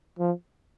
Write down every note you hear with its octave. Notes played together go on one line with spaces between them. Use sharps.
F3